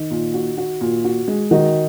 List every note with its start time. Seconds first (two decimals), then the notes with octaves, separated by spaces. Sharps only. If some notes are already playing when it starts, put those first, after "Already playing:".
Already playing: D#3 D#4
0.11 A#2
0.34 F#4
0.58 F#4
0.81 A#2
1.04 F#4
1.28 G#3
1.51 D#3 D#4 F#4